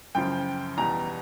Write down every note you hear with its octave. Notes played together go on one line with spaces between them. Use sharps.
F#2 C#3 F3 G5
E2 B2 G3 A#5